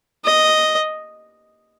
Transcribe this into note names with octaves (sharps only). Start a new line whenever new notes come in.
D#5